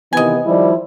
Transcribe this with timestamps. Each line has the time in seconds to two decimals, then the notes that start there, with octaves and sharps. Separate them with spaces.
0.13 C3 D#3 E3 B3 D#5 G#5
0.46 D#3 F3 G3 E4